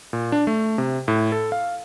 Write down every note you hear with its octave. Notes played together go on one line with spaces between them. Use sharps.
A#2
D4
A3
C3
A2
A4
F5